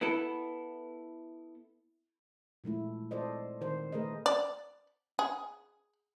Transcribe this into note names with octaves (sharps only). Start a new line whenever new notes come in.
B3 E4 A4
A#2 G#3 A3 E4
A4 C5 D5 D#5
D#3 C5
A3 G#4 A#4 B4 D#5
D5
G#4